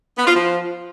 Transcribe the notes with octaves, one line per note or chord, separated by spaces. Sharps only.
B3
F4
F3